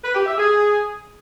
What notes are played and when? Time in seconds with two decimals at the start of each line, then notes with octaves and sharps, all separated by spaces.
0.03 B4
0.15 G4
0.26 E5
0.38 G#4